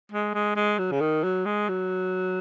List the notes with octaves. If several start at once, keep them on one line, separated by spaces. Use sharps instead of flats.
G#3
G#3
G#3
F#3
C#3
D#3
F#3
G#3
F#3